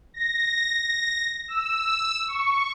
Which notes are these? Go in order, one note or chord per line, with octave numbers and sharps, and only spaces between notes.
A#6
A#6
E6
C#6